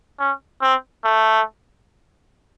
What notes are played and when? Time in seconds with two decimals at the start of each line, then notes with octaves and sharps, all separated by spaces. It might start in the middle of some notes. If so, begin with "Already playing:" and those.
0.19 C#4
0.62 C4
1.04 A3